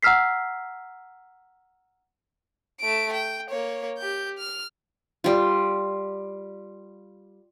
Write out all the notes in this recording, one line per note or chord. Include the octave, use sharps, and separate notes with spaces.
F#5 A#5 E6 F6 B6 C7
A3 D7
G5
A#3 C#5
G4 G6
F6
G3 F4